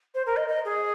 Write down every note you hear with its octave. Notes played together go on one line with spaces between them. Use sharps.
C5
A#4
D#5
D#5
G#4